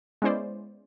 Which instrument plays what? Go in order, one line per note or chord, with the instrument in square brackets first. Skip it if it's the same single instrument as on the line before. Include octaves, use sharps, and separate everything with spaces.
[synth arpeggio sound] G#3 B3 C#4 E4 C5 D5